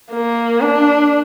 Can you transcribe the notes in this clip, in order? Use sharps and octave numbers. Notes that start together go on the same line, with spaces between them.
A#3
D4